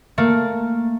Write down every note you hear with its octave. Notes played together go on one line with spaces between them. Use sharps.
A3 A#3